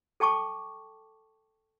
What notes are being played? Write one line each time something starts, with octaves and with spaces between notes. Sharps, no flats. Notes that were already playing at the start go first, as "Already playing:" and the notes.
A4 G5 A5 C#6 D6